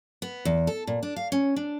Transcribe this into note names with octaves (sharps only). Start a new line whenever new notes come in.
B3
E2
A4
A#2
D4
F5
C#4
D4